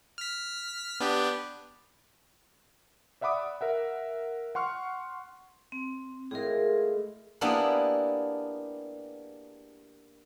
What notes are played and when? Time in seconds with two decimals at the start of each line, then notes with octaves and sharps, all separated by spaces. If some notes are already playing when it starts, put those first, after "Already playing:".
0.18 F6 B6
1.00 B3 D4 G4
3.21 D5 E5 F#5 B5 D6 D#6
3.61 A#4 E5 F#5
4.55 F#5 C6 C#6 F6
5.72 C4
6.31 A2 G#3 F4 G#4 A#4
7.41 A#3 B3 D4 E4 G4 G#4